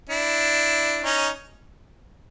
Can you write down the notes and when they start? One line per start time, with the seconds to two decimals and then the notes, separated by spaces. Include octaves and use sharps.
0.09 D4 E4
1.04 C#4 D#4